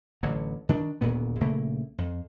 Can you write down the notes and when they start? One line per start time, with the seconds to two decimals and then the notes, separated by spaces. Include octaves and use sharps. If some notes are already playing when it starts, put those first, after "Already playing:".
0.23 A1 D3 F#3
0.69 D#3 D4
1.01 D#1 D2 A#2 B3
1.40 A#1 C#3 A3 A#3
1.98 F2